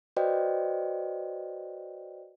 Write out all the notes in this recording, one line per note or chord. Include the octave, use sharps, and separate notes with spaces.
F#4 B4 C5 D5 D#5 G5